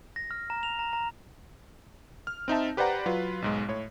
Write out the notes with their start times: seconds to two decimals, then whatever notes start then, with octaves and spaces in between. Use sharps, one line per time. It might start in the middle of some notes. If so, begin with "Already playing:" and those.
0.16 A#6
0.31 F6
0.50 A#5
0.63 F7
0.79 A#5
0.93 A#5
2.27 F6
2.48 C4 D#4 E5 A5
2.77 G4 B4 C5 D5 F#5 A#5
3.06 F#3 F4 B4
3.42 B1 G#2 G#3
3.68 A2 C#5